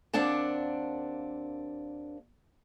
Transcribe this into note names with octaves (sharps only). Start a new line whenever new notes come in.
D#2 A#3 C4 D4 F#5 A5